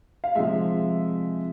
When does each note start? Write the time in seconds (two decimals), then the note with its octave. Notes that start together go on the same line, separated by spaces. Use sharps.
0.24 F5
0.35 C3 F3 G#3 E5